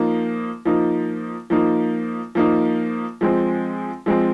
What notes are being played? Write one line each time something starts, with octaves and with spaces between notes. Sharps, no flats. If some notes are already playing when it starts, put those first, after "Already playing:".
Already playing: F3 A#3 D#4
F3 A#3 D#4
F3 A#3 D#4
F3 A#3 D#4
F3 G#3 C4
F3 G#3 C4